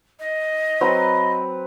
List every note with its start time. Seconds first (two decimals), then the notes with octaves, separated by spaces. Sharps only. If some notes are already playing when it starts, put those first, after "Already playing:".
0.20 D#5
0.81 F#3 C4 B4